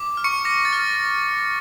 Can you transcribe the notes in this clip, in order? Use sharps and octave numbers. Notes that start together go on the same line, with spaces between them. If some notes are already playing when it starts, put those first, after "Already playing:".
Already playing: D6
F6
C#6 C#7
D6 A#6
A6
F6